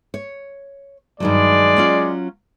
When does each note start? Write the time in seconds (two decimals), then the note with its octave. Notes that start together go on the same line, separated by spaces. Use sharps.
0.14 C#5
1.20 G2 D#3 F#3 G#3 D5
1.77 F#3 C#4 F4